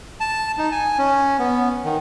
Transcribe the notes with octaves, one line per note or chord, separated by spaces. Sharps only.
A5
D#4
G#5
C#4
B3
D#3